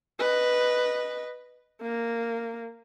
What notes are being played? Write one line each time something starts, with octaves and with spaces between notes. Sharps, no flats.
B4 D#5
A#3